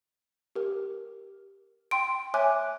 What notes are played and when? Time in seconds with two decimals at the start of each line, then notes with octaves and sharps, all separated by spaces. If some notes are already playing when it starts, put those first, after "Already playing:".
0.55 G4 A#4
1.91 G5 C6 D7
2.34 C#5 E5 G#5 D6 F#6